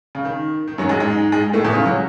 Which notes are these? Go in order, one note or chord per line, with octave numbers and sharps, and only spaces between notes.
C#3
D#3
D#3
F#2 F#3
G#2 G#3
G#2 G#3
G#2 G#3
A2 A3
E2 E3
C#3
F#3